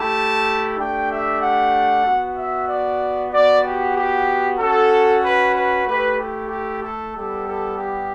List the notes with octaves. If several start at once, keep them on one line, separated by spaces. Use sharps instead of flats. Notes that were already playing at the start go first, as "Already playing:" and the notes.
Already playing: A3 E4 G4 A5
A3 D4 G4 G5
E5
F#5
B3 F#4
E5
D5
B3 F#4 D5
G4
G4
C#4 F#4 A4
B4
B4
A3 E4 G4 B4
G4
G4
A4
G3 B3 E4 G4 A4
A4
G4